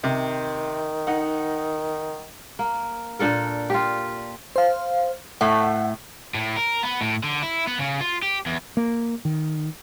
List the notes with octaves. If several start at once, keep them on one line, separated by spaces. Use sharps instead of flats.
C3 D#3
D#4 F#5
A#3
A#2 D4 A4 A#4
F4 G4
C5 F5
A2 A3 F#5
A2
A#4
B3
A2
D3
E4
B3
C#3
F4
G4
E2
A#3
D#3